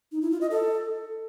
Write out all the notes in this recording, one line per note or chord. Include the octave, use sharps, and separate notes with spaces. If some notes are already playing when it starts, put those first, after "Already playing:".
D#4
E4
F4
D#5
A4